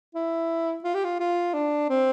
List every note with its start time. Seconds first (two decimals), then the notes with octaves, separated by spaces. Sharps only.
0.15 E4
0.84 F4
0.94 G4
1.04 F4
1.20 F4
1.53 D4
1.89 C4